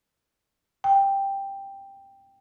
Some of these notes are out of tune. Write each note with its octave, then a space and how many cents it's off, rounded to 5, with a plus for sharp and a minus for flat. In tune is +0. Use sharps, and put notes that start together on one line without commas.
G5 +5